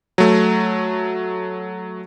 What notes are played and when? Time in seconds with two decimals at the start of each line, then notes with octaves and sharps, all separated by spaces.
0.18 F#3 A3